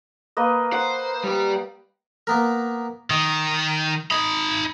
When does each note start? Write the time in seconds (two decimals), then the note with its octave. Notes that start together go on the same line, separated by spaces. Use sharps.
0.37 A#3 B4 D#5
0.73 C5 F#5
1.24 G3 G4
2.27 A#3 B3 A#4
3.10 D#3 D#5
4.11 D#4 D#5 B5